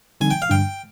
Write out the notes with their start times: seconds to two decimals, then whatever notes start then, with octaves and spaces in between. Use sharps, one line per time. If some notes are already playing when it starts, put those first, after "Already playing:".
0.21 D3 G3 C4 D#4 G#5
0.31 G5
0.42 F5
0.49 G2 D3 G3 D4 G5